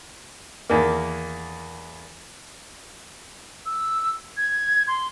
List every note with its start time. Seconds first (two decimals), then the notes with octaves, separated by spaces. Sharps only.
0.70 E2 D#3 A#3
3.66 E6
4.37 G#6
4.88 C6